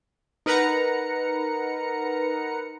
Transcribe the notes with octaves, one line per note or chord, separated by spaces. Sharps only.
D#4 A#4 B4 F#5 A#5 C#7